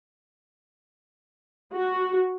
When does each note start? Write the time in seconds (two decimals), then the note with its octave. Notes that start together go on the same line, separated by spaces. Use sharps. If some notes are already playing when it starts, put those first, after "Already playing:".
1.74 F#4